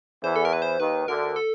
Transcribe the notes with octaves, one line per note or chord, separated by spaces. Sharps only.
E2 E3 C5
A4
A#4
B4
C5
D#2 D#3 B4
D2 D3 A#4
A4